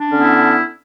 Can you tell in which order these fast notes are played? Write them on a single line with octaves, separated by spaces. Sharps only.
D4 C#4 D3 B3 E4